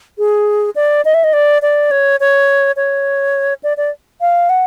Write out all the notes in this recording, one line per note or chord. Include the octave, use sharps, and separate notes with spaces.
G#4
D5
D#5
E5
D#5
D5
D5
C#5
C#5
C#5
D5
D5
F5
F#5